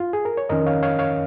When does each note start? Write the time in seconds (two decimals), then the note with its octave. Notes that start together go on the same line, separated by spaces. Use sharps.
0.00 F4
0.13 G#4
0.25 A#4
0.37 C#5
0.49 F2 D#3 C#4 A#4 D#5
0.66 C#5 F5
0.83 C#5 F5
0.99 C#5 F5